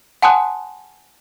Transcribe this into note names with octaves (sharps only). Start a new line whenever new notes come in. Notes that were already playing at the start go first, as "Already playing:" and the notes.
F#5 G#5 A5 C6 D#6 F#6